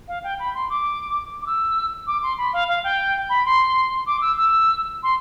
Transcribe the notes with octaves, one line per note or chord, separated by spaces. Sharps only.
F5
G5
B5
C6
D6
D6
E6
D6
C6
B5
F5
F5
G5
B5
C6
C6
D6
E6
E6
C6